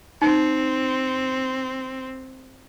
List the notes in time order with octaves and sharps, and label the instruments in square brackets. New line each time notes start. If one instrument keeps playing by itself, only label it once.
[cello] C4 [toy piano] D#4